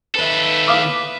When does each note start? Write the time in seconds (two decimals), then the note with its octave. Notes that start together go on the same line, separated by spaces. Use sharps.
0.15 D#2 A4 B4 E5
0.67 F5 D6 D#6